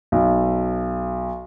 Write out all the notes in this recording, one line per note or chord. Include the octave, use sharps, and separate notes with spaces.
B1